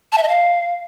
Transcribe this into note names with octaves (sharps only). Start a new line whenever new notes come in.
A5
E5
D#5
F5